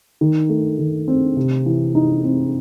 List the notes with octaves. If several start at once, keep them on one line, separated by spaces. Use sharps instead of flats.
D#3
A3
D#3
C4
C3
E3
D#4
C4